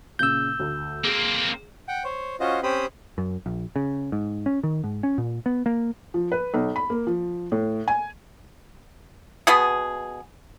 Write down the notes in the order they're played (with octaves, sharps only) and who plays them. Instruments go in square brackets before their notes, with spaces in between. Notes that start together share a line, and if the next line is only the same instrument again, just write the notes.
[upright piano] A#2 C#3 [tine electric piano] E6 G6
[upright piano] D2
[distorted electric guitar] A#3 C4 [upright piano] G#4
[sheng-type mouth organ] F#5 G5
C5 C#5
C#4 F4 F#4 C5 D#5
C4 C#4 G4 C5 B5 D#6
[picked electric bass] F#2
A#1
C#3
G#2
C#4
D#3
G#2
C#4
A#2
B3
A#3
[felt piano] F3
B4
B1
B5
A#3
F3
A2
G#5
[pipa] B2 B3 G#4